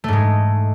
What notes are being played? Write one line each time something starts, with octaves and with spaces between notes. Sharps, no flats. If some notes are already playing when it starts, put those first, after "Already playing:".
G#2 G#3 A3